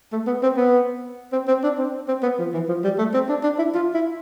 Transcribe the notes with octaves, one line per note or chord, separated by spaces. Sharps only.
A3
B3
C4
B3
C4
C4
D4
C4
C4
B3
F3
E3
F3
G3
A3
C4
D4
D4
E4
F4
E4